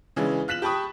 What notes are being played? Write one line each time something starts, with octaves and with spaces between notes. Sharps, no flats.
C#3 E3 G#3 C#4 D4
F4 F#6 B6 E7 F#7
G4 G5 A5 B5 C#6 D#6